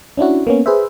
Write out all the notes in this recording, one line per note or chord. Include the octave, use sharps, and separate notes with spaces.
C#4 D4 E4 F#4
A#3 B3 C#4
G#4 B4 C5 E5